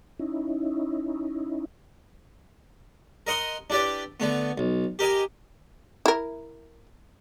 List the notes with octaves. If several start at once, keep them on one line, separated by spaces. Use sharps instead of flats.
C#4 D#4 E4
A#4 D#5 F#5 C6 D#6
D4 E4 G4 B4 D5
D3 A3 B3
B1
G4 A#4 D#5 G#5
E4 A#4